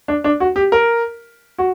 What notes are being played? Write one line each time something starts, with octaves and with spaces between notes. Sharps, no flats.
D4
D4
F#4
G4
A#4
F#4